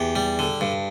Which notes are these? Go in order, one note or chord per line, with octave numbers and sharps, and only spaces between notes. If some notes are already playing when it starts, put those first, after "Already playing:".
Already playing: E2 G4
G3
D3
G2